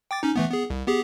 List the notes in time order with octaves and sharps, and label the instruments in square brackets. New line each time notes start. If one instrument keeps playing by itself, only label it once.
[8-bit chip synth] G5 D6 A6
C#4 D#4
E3 A3 B3
B3 G#4
C2
B3 G4 G#4